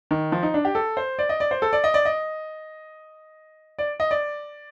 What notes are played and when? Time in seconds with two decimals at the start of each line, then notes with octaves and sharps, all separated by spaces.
0.11 D#3
0.32 F3
0.43 D#4
0.54 D4
0.65 G4
0.75 A4
0.97 C5
1.19 D5
1.29 D#5
1.40 D5
1.51 C5
1.62 A4
1.73 D5
1.84 D#5
1.94 D5
2.05 D#5
3.79 D5
4.00 D#5
4.11 D5